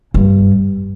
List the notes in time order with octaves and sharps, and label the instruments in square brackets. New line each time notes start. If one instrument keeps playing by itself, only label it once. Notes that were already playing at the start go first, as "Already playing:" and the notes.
[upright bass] G2